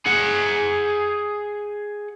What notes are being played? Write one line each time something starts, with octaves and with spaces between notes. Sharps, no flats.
G#4 F#5